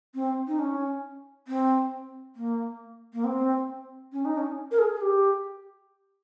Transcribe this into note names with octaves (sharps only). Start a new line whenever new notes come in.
C4
D#4
C#4
C4
A#3
A#3
C4
C#4
D#4
C#4
A#4
G#4
G#4
G4